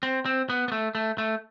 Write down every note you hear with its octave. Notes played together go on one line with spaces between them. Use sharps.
C4
C4
B3
B3
A3
A3
A3